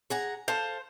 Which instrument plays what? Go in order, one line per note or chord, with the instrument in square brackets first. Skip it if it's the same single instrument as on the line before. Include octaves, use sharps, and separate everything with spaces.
[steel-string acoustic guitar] G#4 F#5 A#5
[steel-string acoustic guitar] A4 F5 [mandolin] C5